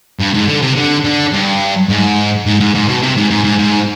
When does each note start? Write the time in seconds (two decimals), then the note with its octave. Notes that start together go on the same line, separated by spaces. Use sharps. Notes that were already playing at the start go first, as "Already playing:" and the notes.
0.19 G2
0.34 G#2
0.48 D3
0.62 C3
0.76 D3
1.05 D3
1.33 G2
1.89 G#2
2.46 G#2
2.60 G#2
2.75 G#2
2.88 B2
3.02 C3
3.17 G#2
3.31 G#2
3.44 G#2
3.59 G#2